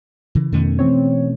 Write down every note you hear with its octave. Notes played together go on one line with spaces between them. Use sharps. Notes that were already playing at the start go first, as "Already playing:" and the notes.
C#3 E3
F2 B2 D#3 A3 C#4
E3 C4 C#5